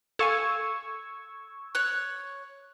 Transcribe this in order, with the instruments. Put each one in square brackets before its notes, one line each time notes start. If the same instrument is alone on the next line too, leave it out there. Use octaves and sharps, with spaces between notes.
[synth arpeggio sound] A4 F5 G#5 [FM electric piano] C#6 E6 G#6
[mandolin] C#5 F#6